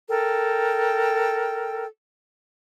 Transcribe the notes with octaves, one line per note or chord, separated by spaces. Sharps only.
A4 A#4 G5